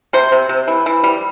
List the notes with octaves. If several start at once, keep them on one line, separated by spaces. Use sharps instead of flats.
C3 C5
C3
C3
E3
E3
G3